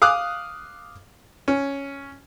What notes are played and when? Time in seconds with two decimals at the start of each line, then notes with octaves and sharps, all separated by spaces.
0.02 F5 D6 D#6 F6 F#6
1.48 C#4